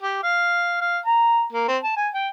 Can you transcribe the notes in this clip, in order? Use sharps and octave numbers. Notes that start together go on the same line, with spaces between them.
G4
F5
F5
A#5
A#3
C4
A5
G#5
G5